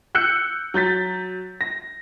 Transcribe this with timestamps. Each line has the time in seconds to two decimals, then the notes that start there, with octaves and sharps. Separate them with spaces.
0.15 E6 F#6 G6 C#7
0.74 F#3 G6 A6 B6
1.61 A#6